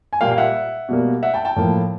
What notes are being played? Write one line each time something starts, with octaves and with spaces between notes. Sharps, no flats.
G#5
A#2 G3 A#3 F5 G5
F5
E5 F#5
B2 G3 A#3
E5 F#5
G5 A5
G5 A5
A2 F3 A#3